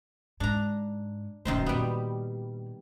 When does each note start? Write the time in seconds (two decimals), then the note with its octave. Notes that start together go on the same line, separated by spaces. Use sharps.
0.40 G#2 D4 A#5
1.45 D1 A#1 F#2 D#3 C5
1.66 A#2 G3 B3 D4